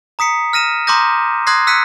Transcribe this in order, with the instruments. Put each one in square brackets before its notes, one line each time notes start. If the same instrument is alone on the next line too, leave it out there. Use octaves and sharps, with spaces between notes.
[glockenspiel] A#5 D#6 B6 C#7
F6 A#6 D#7 E7
A#5 C6 D6 D#6 G6 A#6
C6 D#6 F#6 G#6 A#6 C7
E6 F#6 B6 C#7 D#7